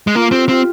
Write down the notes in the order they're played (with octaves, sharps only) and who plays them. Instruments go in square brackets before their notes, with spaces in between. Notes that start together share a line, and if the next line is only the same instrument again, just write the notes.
[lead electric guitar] G#3
[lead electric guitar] A#3 [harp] F4
[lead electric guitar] C4 [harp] G4
[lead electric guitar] C4 [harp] F4